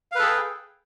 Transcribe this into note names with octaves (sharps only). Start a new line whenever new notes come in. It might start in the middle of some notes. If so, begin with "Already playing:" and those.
G#4 A4 B4 F5 G5